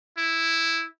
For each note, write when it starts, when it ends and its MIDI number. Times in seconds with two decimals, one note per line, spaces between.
0.18 0.86 64